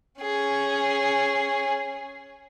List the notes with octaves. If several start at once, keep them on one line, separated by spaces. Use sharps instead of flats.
C#4 G#4